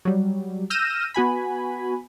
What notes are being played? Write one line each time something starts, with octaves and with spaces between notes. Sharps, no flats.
F#3 G3
E6 F6 G6 A#6 D#7 E7
B3 F#4 G#5 B5